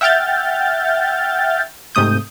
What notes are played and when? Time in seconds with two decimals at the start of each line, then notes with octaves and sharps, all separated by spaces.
0.01 E5 F#5 G5 F6 G6 A6
1.95 G#2 C3 A3 D#6 G6